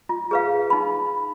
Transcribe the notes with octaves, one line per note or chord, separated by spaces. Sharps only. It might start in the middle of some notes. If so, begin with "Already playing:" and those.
F4
G#4 B4 F5
D#4 B5